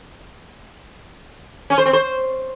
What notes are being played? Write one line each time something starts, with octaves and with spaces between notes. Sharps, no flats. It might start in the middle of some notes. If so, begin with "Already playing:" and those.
C#4
C5
C4
C5